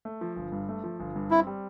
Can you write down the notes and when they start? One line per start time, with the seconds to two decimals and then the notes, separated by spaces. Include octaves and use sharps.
0.05 A3
0.21 F3
0.36 G1
0.52 G2
0.69 A3
0.84 F3
1.00 G1
1.16 G2
1.30 C4 E4
1.47 G3